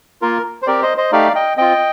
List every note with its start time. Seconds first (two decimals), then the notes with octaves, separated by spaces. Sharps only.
0.22 A#3 F4 A#4
0.62 C5
0.67 C4 G4 A#4 D5
0.83 C5 D#5
0.97 C5 D#5
1.12 A3 D#4 G4 D5 F5
1.35 D#5 G5
1.57 C4 F4 D#5 G5